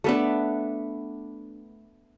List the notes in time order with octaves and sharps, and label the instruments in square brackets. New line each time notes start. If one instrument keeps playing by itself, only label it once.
[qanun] A3 B3 D4